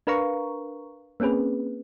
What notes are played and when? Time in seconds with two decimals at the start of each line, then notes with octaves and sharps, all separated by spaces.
0.07 D4 A#4 B4 F5 A#5 C#6
1.20 A#3 C4 C#4 G#4 B4